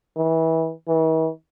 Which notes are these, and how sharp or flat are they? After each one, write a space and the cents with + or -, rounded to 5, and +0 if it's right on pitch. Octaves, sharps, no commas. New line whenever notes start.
E3 -25
E3 -45